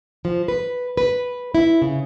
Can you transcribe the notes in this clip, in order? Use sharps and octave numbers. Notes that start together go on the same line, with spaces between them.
F3
B4
B4
E4
C#3